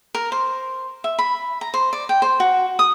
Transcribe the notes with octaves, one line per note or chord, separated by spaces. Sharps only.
A#4
C5
E5
B5
A#5
C5
D5
G5
C5
F#4
D#6